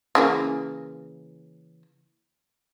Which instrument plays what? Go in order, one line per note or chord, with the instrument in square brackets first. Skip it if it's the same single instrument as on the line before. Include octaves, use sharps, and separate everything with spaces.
[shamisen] C#3 E3 A#3